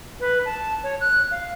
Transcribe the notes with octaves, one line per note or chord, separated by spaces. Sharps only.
B4
A5
C#5
F#6
F5